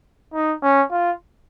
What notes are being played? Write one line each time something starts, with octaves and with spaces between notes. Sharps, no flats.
D#4
C#4
F4